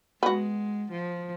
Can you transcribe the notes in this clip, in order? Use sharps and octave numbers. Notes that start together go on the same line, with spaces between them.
G#3 B3 F#4
F3